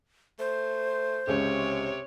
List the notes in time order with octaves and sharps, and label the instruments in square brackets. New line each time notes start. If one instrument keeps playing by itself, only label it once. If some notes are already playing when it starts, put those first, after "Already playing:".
[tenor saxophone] A3 [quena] C5
[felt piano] C#2 G#3 C#4 [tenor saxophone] C3 [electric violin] C#5